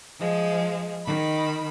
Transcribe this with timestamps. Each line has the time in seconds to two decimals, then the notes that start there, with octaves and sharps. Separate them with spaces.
0.19 F3 G#3
1.04 D#3 B5